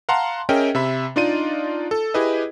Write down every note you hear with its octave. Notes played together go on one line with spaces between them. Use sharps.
F5 F#5 A5 A#5 C6
C#4 G#4 A#4 D#5 E5 G5
C3 E5 B5
D4 D#4 F4 D5 D#5 D#7
A4
E4 G4 G#4 B4 D#5